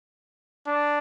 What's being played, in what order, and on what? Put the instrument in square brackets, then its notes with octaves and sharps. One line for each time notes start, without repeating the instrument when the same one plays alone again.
[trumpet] D4